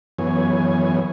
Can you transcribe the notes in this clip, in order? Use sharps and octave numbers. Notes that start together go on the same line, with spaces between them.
F#2 E3 B3 C#5 G#5